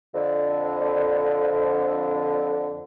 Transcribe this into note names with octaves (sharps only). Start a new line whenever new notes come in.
F2 D3